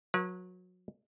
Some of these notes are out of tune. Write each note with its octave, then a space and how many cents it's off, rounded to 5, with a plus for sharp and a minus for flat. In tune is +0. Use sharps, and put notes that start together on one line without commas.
F#3 -25 B4 -45